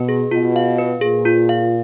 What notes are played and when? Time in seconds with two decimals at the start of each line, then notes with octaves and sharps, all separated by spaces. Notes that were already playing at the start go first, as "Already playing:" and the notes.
Already playing: B2 B4
0.09 G#4
0.31 B2 F4
0.56 F5
0.79 B4
1.01 A#2 G#4
1.25 F4
1.49 F5